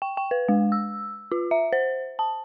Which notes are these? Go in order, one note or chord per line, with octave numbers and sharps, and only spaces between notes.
G5
G5
B4
G#3
E6
F4
E5
C5
A5